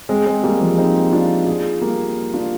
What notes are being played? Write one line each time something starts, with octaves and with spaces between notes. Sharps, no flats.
G#3 C4
G#3 C4
G3 A#3
F3 G#3
C4 D#4
D4 F4
F4 G#4
G3 A#3
D4 F4